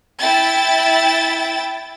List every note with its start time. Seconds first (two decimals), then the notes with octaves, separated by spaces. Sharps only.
0.19 E4 G5 A6